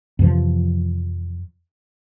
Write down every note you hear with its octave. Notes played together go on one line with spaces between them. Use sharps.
F2 C3 E3 F3